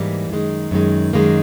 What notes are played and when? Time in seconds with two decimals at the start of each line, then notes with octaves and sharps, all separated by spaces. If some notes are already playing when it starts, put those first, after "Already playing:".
Already playing: G#2 E3 G3 A#3
0.29 F#2 D#3 G#3
0.71 F#2 D#3 G#3
1.13 F#2 D#3 G#3 A#3